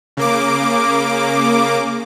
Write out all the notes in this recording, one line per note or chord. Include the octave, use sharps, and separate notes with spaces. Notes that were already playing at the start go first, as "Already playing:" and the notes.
C#3 A#3 D6